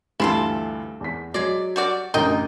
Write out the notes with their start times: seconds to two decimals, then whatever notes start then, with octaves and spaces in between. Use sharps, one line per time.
0.20 D2 G2 E3 E4 F4 A4
1.01 E2 B6
1.34 F#3 G#3 D5
1.76 G3 F#4 D5
2.14 A1 F#2 D3 A#4 D#5 G5